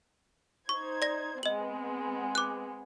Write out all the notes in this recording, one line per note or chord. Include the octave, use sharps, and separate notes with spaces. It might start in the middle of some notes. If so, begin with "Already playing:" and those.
D#4 C5 C#6 G#6
D5 A#6
G#3 B3 C4 D#5 F#7
D6 F#6